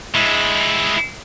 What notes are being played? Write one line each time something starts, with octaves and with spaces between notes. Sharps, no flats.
G#3 E4